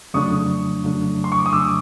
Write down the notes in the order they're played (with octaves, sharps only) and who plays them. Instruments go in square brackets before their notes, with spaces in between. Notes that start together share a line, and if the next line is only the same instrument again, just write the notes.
[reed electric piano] F2 C#3 F#3 A3 D4 [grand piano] C#6 D#6
[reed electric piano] F2 C#3 F#3 A3 D4
[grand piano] C6
C#6
D6
D#6
[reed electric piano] F2 C#3 F#3 A3 D4 [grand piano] D6 E6